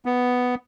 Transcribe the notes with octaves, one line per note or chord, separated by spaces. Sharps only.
B3